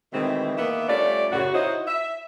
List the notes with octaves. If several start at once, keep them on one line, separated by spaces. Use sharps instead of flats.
B2 D#3 E3 G#3 A3 C4
D#3 A#3 B3 E5
G3 A3 C#4 F4 D5
F#2 A2 C#3 F#4
D#4 E4 F#4 C5 C#5 D#5
E5